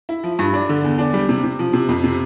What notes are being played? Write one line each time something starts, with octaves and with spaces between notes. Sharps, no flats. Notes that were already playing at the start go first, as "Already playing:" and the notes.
E4
F3
G2
D4
D3
E2
D4
G3
C3
C3
F3
C3
F2
C3